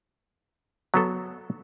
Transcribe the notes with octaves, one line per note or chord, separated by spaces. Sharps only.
F#3 B3 A4